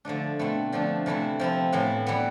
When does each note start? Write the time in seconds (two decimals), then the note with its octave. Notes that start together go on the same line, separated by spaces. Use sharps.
0.05 D3 F3 A3 D4
0.39 B2 A3 C4 E4
0.73 D3 F3 A3 D4
1.06 C3 E3 A3 E4
1.39 F3 C4 E4
1.72 A2 E3 B3 E4
2.07 E3 G3 B3